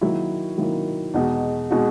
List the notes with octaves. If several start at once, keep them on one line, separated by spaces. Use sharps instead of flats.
D#3 F#3 A#3 E4
D#3 F#3 A#3 E4
E2 B2 G#3 D#4 F#4
B2 G#3 D#4 F#4